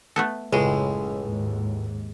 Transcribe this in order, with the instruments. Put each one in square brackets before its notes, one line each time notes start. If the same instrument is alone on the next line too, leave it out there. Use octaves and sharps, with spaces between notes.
[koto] A3 B3 A4
[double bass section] F#1 C#3 [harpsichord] C#2 A2 [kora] G#3
[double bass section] D#2 G#2